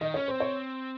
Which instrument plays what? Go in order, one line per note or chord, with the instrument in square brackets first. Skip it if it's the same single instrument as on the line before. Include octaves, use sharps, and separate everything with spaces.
[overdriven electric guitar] D#3 [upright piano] D#5
[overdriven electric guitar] C#4 [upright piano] C#5
[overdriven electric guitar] C4 [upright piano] C5
[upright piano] C#5